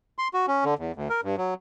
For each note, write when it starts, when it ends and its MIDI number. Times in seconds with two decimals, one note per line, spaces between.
0.19 0.28 84
0.34 0.46 66
0.48 0.64 61
0.65 0.74 50
0.79 0.92 40
0.96 1.08 38
1.10 1.21 70
1.23 1.36 43
1.38 1.54 54